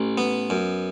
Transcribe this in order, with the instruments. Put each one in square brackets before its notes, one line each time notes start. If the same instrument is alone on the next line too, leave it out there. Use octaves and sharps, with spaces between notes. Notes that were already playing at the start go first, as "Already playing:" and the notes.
Already playing: [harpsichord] A1
B3
F#2